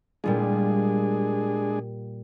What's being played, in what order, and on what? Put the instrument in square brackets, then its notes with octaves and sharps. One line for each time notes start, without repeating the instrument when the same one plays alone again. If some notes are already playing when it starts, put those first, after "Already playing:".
[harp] A#2 G3 F4 [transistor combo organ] G#3 D4 G#4